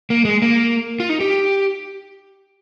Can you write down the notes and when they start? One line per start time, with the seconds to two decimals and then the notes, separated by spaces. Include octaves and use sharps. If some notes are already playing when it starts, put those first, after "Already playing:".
0.10 A#3
0.25 G#3
0.42 A#3
1.00 F4
1.09 D#4
1.21 G4